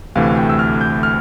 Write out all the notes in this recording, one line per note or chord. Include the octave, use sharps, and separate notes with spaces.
D2 C3 E3 A3 F5
G5
E6
F6
G6
F6